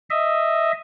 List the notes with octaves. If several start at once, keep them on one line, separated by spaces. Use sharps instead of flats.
D#5 E5